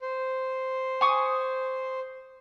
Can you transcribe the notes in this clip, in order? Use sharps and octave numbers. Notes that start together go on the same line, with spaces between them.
C5
G#5 C#6 D#6